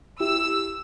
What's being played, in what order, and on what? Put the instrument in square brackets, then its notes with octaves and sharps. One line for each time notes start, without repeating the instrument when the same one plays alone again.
[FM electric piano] E4 G4 [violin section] E6